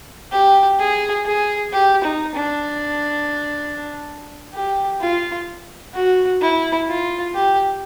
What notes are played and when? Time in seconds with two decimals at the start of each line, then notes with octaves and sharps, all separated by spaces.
0.32 G4
0.79 G#4
1.25 G#4
1.73 G4
2.04 D#4
2.35 D4
4.54 G4
5.01 F4
5.94 F#4
6.42 E4
6.88 F4
7.35 G4